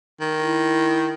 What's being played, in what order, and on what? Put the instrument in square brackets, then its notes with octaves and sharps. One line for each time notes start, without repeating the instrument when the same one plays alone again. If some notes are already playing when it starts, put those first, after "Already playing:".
[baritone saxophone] D#3
[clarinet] E4